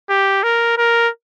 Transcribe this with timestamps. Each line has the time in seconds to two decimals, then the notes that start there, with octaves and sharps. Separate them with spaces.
0.10 G4
0.43 A#4
0.78 A#4